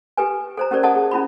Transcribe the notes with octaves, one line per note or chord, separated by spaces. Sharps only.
G4 A4 B4 G#5
A4 C5 A#5
C#4 G4 A#4 C5 D5
A4 D#5 F#5 A5 D#6
G#4
C#4 E4 F#4 B5